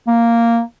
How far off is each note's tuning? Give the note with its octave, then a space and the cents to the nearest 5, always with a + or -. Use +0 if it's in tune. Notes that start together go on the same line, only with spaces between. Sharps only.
A#3 -5